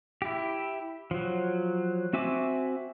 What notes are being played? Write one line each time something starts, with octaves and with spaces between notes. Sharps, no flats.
E4 G4
F3 F#3
C4 F#4 E5 G#5 D6